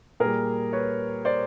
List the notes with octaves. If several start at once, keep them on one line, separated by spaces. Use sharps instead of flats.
A#2 G3 G#4 A#4
B4 C#5
C5 D5